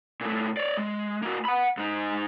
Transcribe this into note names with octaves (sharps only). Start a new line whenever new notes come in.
A#2 A3
C#5 D5
G#3
A#3 F#4
F#5 B5
G#2 D#4